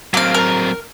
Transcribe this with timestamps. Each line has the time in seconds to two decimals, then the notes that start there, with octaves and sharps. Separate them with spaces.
0.14 F#3 A#3 C4 F5
0.34 A#4